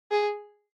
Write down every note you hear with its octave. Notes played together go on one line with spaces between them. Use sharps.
G#4